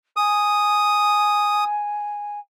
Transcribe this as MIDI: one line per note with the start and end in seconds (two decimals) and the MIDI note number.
0.16 2.39 80
0.16 1.64 87